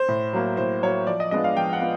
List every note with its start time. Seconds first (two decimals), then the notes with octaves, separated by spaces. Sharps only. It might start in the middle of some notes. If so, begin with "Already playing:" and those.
Already playing: C5
0.08 A2
0.33 F#3 A#3
0.57 A2 C5
0.83 F#3 A#3 C#5
1.07 F3 D5
1.20 D#5
1.31 G#3 B3 D4 F4 D#5
1.44 F5
1.57 F3 G5
1.73 F#5
1.81 B3 F4